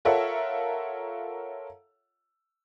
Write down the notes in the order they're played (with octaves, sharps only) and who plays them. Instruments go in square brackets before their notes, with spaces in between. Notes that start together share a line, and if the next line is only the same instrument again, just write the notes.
[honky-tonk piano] F4 A4 A#4 C#5 E5 F#5